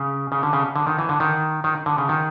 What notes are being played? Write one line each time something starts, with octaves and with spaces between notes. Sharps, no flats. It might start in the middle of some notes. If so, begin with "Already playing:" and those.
Already playing: C#3
C#3
D3
C#3
D3
D#3
E3
D3
D#3
D#3
D3
C#3
D#3